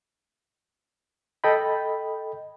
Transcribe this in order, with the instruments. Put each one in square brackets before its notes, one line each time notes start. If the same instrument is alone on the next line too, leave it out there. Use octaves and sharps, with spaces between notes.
[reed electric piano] A4 D#5 G5 B5